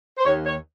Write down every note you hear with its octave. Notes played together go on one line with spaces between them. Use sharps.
C5
D#2 C#5
C#5